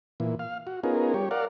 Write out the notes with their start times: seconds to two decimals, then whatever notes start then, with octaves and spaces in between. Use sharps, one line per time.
0.20 A#2 E3
0.39 F5
0.67 F#4
0.84 B3 C#4 D#4 F4 G#4 A#4
1.14 G3 G4 C#5
1.31 A#4 D5 F5 F#5